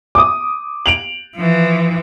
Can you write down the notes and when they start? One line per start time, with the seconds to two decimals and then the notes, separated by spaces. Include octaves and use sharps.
0.15 D6 D#6
0.86 D7 F7 F#7
1.36 E3 F3